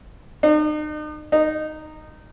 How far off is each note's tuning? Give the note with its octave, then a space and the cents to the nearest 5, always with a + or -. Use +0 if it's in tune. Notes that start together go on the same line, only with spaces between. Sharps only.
D#4 -40
D#4 -10